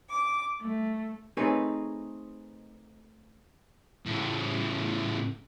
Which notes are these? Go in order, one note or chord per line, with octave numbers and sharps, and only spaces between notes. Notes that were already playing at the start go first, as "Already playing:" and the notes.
D6
A3
A3 C4 D#4 G#4 B4 C#5
A2 C#3